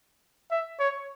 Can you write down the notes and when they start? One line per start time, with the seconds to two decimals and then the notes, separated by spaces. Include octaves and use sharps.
0.51 E5
0.80 C#5